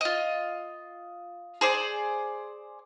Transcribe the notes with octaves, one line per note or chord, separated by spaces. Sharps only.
F4 D#5
G#4 C5 D5